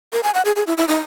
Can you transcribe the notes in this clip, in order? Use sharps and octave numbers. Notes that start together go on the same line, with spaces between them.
A#4
G#5
F#5
G#4
G#4
E4
E4
D#4